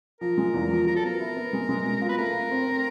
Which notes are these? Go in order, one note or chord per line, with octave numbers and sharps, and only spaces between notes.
F3 A#4
G#3
E2
F3
F#3 A#4
A4
B3 A#4
E4
B3
G#3
G#3
B2
F4
B4
A3 A#4
A3
C4
C4